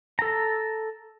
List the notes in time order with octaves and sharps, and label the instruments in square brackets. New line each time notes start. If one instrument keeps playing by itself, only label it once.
[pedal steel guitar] A4 A#5